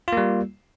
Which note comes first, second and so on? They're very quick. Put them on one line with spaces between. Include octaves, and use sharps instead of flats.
F4 A#3 G3